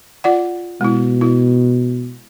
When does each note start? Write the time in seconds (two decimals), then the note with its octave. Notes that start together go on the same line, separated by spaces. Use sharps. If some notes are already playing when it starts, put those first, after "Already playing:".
0.24 F4 D5 F#5
0.81 B2 G#3 E4
1.21 E4